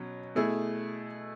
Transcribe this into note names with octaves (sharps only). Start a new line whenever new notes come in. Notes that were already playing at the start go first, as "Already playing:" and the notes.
Already playing: B2 F#3 C#4
B2 A3 E4 G#4